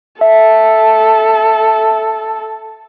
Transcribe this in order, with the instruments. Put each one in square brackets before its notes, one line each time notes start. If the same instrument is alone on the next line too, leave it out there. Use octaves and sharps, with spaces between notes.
[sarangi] A4 [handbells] E5